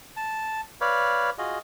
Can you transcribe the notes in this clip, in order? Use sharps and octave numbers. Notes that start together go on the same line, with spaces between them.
A5
B4 C#5 D5 F5
F4 F#4 G#4 D#5